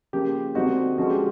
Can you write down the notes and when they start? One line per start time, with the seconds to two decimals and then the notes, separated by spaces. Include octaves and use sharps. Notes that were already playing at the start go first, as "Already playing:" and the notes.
0.13 C#3 F3 A#3 G4
0.55 D3 G3 C4 D#4 F#4
0.98 D3 F3 G#3 C#4 F#4
1.10 G4